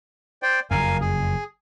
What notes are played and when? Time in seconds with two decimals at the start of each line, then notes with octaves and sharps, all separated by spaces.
0.43 C5 D5 G5
0.71 F#1 F2 A#4 F5 G#5
1.01 G#4